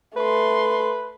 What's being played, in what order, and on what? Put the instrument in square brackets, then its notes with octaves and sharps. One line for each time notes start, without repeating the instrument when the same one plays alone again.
[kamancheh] A3 C6 [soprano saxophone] B4